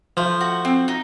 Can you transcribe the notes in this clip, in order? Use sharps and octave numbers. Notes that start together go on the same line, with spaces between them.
F3 A3
F#4
C4
D#4